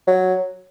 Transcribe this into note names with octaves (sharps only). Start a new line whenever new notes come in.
F#3